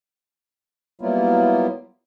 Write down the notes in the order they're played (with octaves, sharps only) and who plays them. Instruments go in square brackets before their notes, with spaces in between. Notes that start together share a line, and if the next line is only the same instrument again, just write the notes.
[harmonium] F#3 G3 A#3 B3 E4 F4